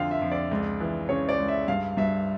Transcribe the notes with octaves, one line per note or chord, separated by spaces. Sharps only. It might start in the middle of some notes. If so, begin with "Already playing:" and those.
Already playing: F2 D3 F3 F5 G5
E5
F2
D5
C#2
E3
C#3 C#5
D5
C#2
E5
G2 F5
G2 E5